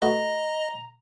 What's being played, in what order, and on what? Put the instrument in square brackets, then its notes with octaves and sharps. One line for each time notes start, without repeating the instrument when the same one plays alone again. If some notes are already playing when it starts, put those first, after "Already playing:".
[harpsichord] A3 B3 F#4 [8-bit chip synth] D#5 [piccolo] A#5